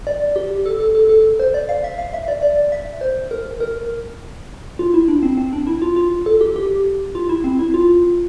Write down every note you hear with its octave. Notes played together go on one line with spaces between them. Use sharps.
D5
G4
A4
A4
A4
A4
C5
D5
F5
E5
F5
E5
D5
D5
E5
C5
A#4
A#4
F4
E4
D4
C4
C4
D4
E4
F4
F4
A4
G4
G4
F4
E4
C4
E4
F4